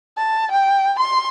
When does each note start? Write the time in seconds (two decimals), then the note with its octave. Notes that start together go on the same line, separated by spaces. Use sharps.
0.18 A5
0.52 G5
1.00 C6